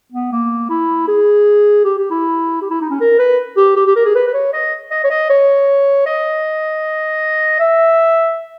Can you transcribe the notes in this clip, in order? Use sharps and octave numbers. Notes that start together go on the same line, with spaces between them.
B3
A#3
E4
G#4
G4
G4
E4
G4
E4
D#4
C#4
A#4
B4
G4
G4
G4
A#4
G#4
B4
B4
C#5
D#5
D#5
C#5
D#5
C#5
D#5
E5